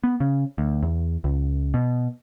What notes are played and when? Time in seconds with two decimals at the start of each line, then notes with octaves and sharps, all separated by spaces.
0.04 B3
0.20 C#3
0.58 D2
0.83 E2
1.24 C#2
1.74 B2